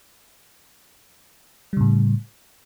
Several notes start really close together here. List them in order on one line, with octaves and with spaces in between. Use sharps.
G3 C#3 A2